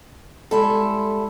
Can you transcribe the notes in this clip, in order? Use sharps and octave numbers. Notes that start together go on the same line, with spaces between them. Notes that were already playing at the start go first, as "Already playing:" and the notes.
G3 G#3 E4 A4 B5 C6